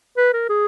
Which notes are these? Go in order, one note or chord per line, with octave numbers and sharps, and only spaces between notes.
B4
A#4
G#4